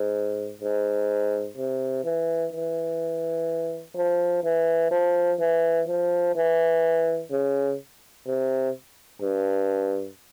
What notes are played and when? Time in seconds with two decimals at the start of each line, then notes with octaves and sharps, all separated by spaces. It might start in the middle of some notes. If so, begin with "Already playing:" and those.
Already playing: G#2
0.62 G#2
1.57 C3
2.04 E3
2.53 E3
3.96 F3
4.44 E3
4.91 F3
5.39 E3
5.88 F3
6.36 E3
7.31 C#3
8.27 C3
9.22 G2